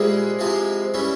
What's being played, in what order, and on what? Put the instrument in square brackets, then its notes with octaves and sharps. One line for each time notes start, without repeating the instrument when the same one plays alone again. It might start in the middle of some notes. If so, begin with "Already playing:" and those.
Already playing: [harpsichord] A#2 G3 C4 E4 [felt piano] G#3 G#4
[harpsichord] C3 F3 C4 E4
E3 G3 C#4 E4